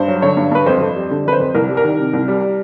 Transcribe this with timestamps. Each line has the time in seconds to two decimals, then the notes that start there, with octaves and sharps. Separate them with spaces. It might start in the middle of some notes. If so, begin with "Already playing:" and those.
Already playing: G2 C5
0.08 F#3
0.22 D3 C#5
0.37 G2
0.51 G2 B4
0.66 F2 C5
0.81 F2
0.96 G3
1.11 D3
1.26 F2 B4
1.32 C5
1.40 F2
1.54 C2 A#4
1.69 G3
1.77 A#4
1.84 D#3
1.99 C3
2.13 C2
2.28 G3